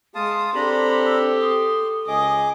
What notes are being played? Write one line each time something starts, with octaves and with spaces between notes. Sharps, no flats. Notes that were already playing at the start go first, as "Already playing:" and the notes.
G#3 F5 A5 C6 D#6
C4 D4 G4 A4 A#5 B5
E6
C6 D#6
C#2 G#4 D#5 D6